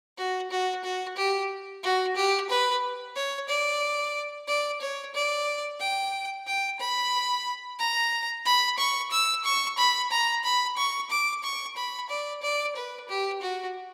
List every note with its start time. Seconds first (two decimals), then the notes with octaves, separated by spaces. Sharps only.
0.18 F#4
0.51 F#4
0.84 F#4
1.17 G4
1.83 F#4
2.16 G4
2.50 B4
3.16 C#5
3.49 D5
4.48 D5
4.81 C#5
5.14 D5
5.80 G5
6.47 G5
6.80 B5
7.79 A#5
8.45 B5
8.78 C#6
9.11 E6
9.44 C#6
9.78 B5
10.11 A#5
10.44 B5
10.77 C#6
11.10 D6
11.43 C#6
11.76 B5
12.10 D5
12.42 D5
12.76 B4
13.08 G4
13.42 F#4